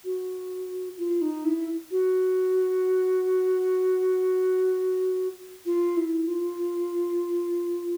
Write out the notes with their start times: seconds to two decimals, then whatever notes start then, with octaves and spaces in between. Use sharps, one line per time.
0.05 F#4
0.98 F4
1.21 D#4
1.45 E4
1.91 F#4
5.66 F4
5.97 E4
6.27 F4